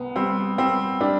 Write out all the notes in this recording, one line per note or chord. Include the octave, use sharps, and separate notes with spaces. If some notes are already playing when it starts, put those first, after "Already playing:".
Already playing: C2 B3
G3 C4
G3 C4
G3 D4